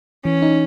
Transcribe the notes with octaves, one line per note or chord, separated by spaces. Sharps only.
E3 C#4
D#4